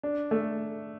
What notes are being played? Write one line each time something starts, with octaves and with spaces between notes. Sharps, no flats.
D4
A3